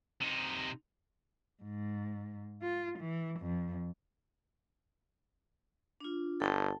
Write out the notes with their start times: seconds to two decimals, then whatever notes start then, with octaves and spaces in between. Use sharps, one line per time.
0.21 C3 D#4
1.63 G#2
2.62 F4
3.00 E3
3.41 F2
6.00 D4 F4
6.40 G1 A4 G5 A5